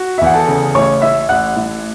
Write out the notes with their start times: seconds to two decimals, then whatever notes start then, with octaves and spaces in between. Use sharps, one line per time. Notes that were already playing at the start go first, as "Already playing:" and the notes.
Already playing: F#4
0.18 E5
0.21 E2 F#5
0.34 A4 A5
0.48 C#3
0.75 A1 C#5 C#6
1.01 A2 E5 E6
1.29 A1 F#5 F#6
1.56 A2